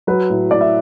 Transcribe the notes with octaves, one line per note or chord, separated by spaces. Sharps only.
F#3 B4
A2
A2 D5
E5